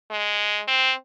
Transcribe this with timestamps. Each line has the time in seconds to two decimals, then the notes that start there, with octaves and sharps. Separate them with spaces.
0.11 G#3
0.68 C4